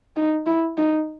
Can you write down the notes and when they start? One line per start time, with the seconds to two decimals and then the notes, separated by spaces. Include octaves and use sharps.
0.16 D#4
0.46 E4
0.78 D#4